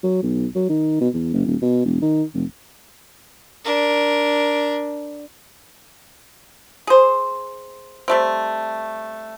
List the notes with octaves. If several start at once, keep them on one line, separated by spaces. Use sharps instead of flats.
F#3
B1
F#3
D#3
B2
E2
F#1
D#1
B2
E1
D#3
F1
D4 A#4
G#4 C5
G3 A3 C4